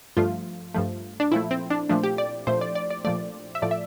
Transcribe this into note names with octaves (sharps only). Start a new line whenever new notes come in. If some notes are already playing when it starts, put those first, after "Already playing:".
G2 F3 A3 F4
G2 F3 A3
D4
A#2 F3 A3 E4
C4
D4
A#2 F3 A3 D4
G4
D5
A#2 F3 A3 C5
D5
D5
D5
A#2 F3 A3 D5
E5
A2 F3 A3 D5
E5